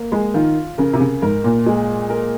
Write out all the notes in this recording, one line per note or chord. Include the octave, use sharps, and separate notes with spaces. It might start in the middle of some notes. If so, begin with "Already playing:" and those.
Already playing: A#3
G#3
D#3 F4
C#3 A#4
C3
C#3
G#2 A#4
A#2
G#3
A#4